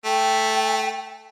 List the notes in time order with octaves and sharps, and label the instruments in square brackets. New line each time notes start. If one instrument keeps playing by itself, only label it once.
[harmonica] A3 [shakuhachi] G5